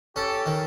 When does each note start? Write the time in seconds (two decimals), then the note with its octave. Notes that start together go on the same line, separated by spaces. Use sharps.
0.15 C#4 G4 A4
0.46 D#3